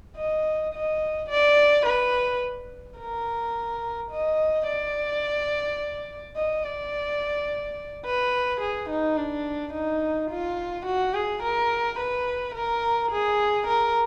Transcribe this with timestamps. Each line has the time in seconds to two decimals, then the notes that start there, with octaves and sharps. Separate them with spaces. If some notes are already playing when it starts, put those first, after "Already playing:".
0.17 D#5
0.74 D#5
1.30 D5
1.86 B4
2.99 A#4
4.11 D#5
4.68 D5
6.36 D#5
6.64 D5
8.06 B4
8.61 G#4
8.90 D#4
9.17 D4
9.74 D#4
10.30 F4
10.86 F#4
11.14 G#4
11.43 A#4
11.99 B4
12.55 A#4
13.11 G#4
13.67 A#4